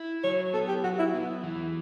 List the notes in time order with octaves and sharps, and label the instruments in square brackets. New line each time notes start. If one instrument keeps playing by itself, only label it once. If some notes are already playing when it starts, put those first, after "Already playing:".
Already playing: [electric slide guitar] E4
[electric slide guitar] F#3 [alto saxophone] C#5
[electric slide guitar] B3 [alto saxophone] A4
[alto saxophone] G4
[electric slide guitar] F#3 [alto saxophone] F#4
[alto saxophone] E4
[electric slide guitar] B3
E3